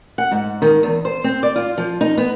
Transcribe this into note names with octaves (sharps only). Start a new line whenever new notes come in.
F#5
G#2
D#3
E2
C5
C4
D5
F4
F3
D#4
B3